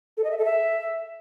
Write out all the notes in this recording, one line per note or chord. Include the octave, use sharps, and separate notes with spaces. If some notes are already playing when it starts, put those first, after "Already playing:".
A4
D#5
E5
A4
E5